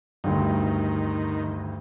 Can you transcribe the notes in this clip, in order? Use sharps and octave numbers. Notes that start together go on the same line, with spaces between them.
D2 G2 D#3